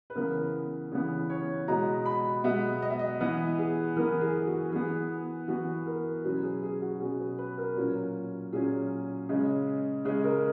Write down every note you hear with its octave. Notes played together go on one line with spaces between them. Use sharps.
B4
C#3 E3 B3 A#4
C#3 E3 B3
C#5
B2 G#3 B3 A#5
B5
B2 G#3 B3 E5
D#5
E5
D#5
E3 B3 B4
G#4
E3 B3 A#4
G#4
F#4
E3 B3 G#4
E3 B3 F#4
A#4
B2 F#3 C#4 B4
G#4
G#4
F#4
B2 F#3 C#4 G#4
B4
B4
A#4
A#2 F#3 C#4
A#2 F#3 C#4 G#4
C#3 G#3 C#4
C#3 G#3 C#4 G#4
A#4